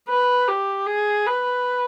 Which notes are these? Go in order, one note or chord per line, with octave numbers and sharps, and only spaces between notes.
B4
G4
G#4
B4